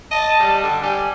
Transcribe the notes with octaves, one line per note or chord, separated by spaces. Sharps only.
D#5 A5
G3
D3
G3 G#5